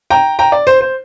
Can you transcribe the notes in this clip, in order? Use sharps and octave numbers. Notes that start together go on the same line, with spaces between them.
G5 A#5
G5 A#5
D5
C5
C5